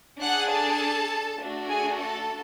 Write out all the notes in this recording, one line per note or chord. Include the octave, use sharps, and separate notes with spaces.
D4 G#4 F#5 F#6
A4 A5
A3 D4 F#4
G#4 G#5
A4 A5